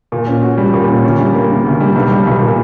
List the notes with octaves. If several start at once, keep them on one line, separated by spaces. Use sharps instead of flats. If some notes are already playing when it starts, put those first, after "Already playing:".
A#2
C#4
F#4
G3
A#2
C#4
D2
G3
A#3
C#3
D2
G3
B1
G3
B1
A#2